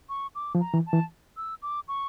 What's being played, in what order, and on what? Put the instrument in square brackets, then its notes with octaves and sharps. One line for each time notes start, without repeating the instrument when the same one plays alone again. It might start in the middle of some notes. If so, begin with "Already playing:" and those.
[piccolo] C#6
D6
[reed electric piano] F3
[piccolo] A#5
[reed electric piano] E3
[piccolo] A5
[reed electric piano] E3
[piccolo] E6
D6
C#6